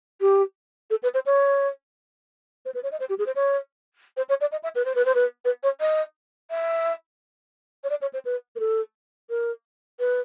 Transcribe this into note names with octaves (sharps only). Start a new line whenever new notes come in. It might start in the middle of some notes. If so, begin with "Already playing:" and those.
G4
A4
B4
C5
C#5
C5
B4
C#5
D#5
C5
G4
G#4
C5
C#5
C5
C#5
D5
D#5
E5
B4
C5
B4
C5
B4
B4
C#5
D#5
E5
C#5
D5
C#5
C5
B4
A#4
A4
A#4
B4